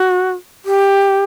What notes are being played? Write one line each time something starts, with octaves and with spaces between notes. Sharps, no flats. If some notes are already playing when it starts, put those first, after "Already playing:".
Already playing: F#4
G4